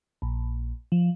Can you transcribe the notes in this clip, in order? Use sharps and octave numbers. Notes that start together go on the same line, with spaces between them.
A#1
F3